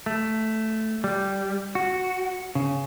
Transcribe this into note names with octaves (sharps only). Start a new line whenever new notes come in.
A3
G3
F#4
C#3